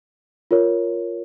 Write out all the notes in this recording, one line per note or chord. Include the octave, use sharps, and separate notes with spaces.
F4 A#4 C#5